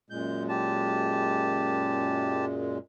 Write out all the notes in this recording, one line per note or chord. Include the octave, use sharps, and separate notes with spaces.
F#2 A#2 G#3 G6
G4 A5